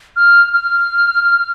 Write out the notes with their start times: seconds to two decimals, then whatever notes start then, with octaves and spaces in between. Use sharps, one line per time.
0.16 F6
0.53 F6